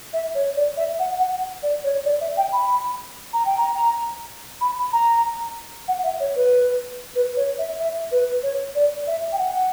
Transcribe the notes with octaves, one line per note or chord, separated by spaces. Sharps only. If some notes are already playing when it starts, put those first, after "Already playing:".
E5
C#5
D5
E5
F#5
F#5
D5
C#5
D5
E5
G5
B5
A#5
G5
A#5
B5
A#5
F#5
E5
C#5
B4
B4
C#5
E5
E5
B4
C#5
D5
E5
G5
F#5